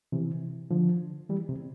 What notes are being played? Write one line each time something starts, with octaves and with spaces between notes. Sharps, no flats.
C3 E3
D3 F3
E3 G3
C3